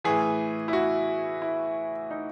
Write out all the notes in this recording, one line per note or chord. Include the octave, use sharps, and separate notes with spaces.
A2 E3 G#4
E4
F#4
E4
D#4